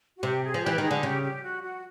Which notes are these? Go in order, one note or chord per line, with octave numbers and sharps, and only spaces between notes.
F#4
C3 G4
G#4
F3
E3 G4
D#3 G#4
D3
C#3 G4
G4
F#4
F#4